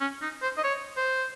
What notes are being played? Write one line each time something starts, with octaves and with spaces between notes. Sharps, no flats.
C#4
D#4
C5
D#5
C#5
C5